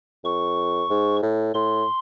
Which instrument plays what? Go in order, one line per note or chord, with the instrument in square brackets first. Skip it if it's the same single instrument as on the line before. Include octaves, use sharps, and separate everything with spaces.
[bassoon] F2 [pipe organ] C#6
[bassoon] G#2
A2
[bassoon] A2 [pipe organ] C6